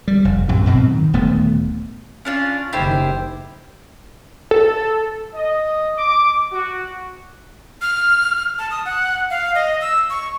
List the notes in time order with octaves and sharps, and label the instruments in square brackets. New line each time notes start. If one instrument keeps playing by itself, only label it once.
[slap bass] G3
F1
A#1 F#2 C3
G#2 B2 F#3 C4
D#3
D#1 D2 A3 B3
[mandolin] C#4 D4 F4
[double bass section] F#1 D#3 [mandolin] E4 G4 C5
[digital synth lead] A4
[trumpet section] D#5
D6
F#4
[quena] F6
A5
D#6
F#5
F5
D#5
E6
C#6